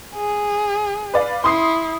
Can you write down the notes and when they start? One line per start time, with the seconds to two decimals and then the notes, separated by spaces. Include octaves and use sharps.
0.16 G#4
1.14 B4 D5 F5
1.44 E4 C6 D#6 C7